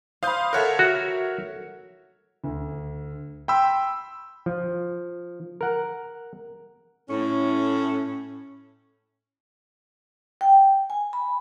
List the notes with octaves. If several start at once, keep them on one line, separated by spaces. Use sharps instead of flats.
C5 F5 B5 D#6 G6
A4 A#4 C#5 E5 F#5 F#6
F#4
D2
G5 B5 C6 E6
F3
A#4 F#5
A2 C#4
G5
G#5
B5